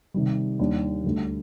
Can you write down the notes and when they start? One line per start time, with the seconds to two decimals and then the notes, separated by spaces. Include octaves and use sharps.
0.14 C3 D#3 G3
0.59 D#2 D#3 G3 D4
1.04 D2 D3 G3